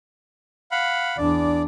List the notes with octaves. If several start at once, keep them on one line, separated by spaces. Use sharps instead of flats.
F5 F#5 B5
E2 D4 D5